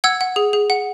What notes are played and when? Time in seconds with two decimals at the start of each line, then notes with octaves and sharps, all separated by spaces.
0.04 F#5 E6 G#6
0.21 F#5
0.36 G#4
0.53 G#4
0.70 F#5